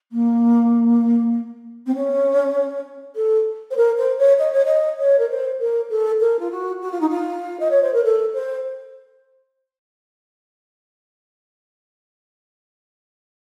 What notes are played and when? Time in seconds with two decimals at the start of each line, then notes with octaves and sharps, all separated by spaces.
0.12 A#3
1.86 C4
1.95 C#4
3.15 A4
3.70 C5
3.76 A#4
3.98 C5
4.18 C#5
4.38 D#5
4.52 C#5
4.65 D#5
4.98 C#5
5.18 A#4
5.30 C5
5.59 A#4
5.90 A4
6.20 A#4
6.39 F4
6.51 F#4
6.81 F#4
6.91 F4
7.00 D#4
7.09 F4
7.59 D#5
7.70 C#5
7.82 C5
7.93 A#4
8.04 A4
8.34 C5